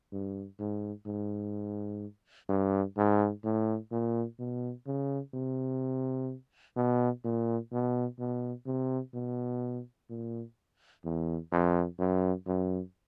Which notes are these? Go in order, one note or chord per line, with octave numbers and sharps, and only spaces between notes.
G2
G#2
G#2
G2
G#2
A2
A#2
B2
C#3
C3
B2
A#2
B2
B2
C3
B2
A#2
E2
F2
F#2
F#2